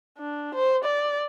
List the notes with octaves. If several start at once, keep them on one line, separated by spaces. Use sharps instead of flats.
D4
C5
D5